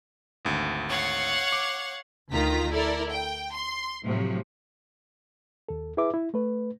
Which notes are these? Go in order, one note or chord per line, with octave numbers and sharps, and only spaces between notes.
G#1 D2
C#5 F5 F#5
D6
D2 D#3 F4 A#5 B6
E4 A4 A#4 D5
G5
C6
A2 C3 F3 F#3
D#2 A4
E4 G#4 B4 E5 D6
E4
A3 B4